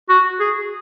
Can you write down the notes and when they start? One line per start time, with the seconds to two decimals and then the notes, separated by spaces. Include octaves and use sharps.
0.09 F#4
0.40 G#4